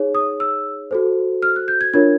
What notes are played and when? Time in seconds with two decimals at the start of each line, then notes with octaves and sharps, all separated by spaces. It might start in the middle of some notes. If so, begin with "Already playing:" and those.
Already playing: D#4 G#4 C#5
0.15 D#6
0.40 E6
0.91 F#4 A4 C5
1.42 F6
1.56 F#6
1.68 G6
1.81 G#6
1.94 D4 F4 A#4 C#5 G#6